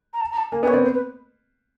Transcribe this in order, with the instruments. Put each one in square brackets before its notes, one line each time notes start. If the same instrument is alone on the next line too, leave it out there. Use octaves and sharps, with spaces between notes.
[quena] A#5
A5
A#5
A5
[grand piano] A#3 [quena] G#5
[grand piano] B3 [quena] G#5
[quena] C#5
[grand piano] C4 [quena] D5
[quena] C5
B4